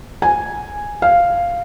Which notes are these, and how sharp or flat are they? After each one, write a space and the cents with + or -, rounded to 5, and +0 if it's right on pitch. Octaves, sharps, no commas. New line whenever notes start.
G#5 -5
F5 -5